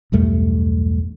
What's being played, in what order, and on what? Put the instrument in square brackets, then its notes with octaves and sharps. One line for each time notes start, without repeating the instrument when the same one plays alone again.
[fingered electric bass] B1 E2 G2 A3